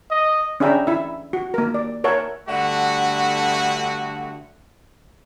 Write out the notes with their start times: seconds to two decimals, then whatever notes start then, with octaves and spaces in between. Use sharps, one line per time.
0.11 D#5
0.60 C#4 D4 G#4 E5 G5 A#5
0.87 E4 E5
1.33 F#4
1.54 A#3 A#4
1.74 D5
2.04 A#4 C#5 E5 F#5 A5
2.48 G2 D3 A3 F#4